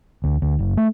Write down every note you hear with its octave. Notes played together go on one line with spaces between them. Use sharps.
D2
D2
F#1
A3